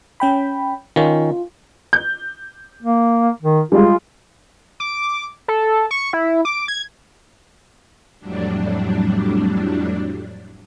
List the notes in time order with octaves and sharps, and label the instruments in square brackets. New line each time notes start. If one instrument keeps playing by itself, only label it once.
[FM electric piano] C#4 G5 B5
[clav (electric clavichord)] D#3 C#4 [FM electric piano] F4
[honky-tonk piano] G6
[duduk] A#3
D#3
[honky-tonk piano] G3 G#3 [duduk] F4
[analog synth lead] D6
A4
C#6
E4
D6
G#6
[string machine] F2 A2 F#3 G3 D4